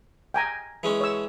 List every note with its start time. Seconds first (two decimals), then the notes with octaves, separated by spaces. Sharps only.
0.34 G5 G#5 A#5
0.83 E3 G#3 C#4
1.01 C#5 E6